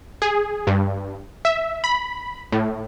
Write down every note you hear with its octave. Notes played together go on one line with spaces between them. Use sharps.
G#4
G2
E5
B5
A2